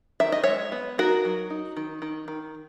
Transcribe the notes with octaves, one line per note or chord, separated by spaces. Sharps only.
D#3 E5
D#5
G#3 C#5 E5
B3
D#4 F#4 A#4
F#3
D#4
D#3
D#3
D#3